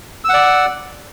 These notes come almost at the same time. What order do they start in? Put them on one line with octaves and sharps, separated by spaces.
E6 F#5 D5